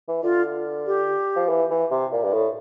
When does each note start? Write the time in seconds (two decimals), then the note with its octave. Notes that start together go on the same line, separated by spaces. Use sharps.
0.08 E3
0.23 D3 F4
0.87 G4
1.36 F3
1.49 E3
1.71 E3
1.91 C3
2.13 A#2
2.24 G2
2.34 A2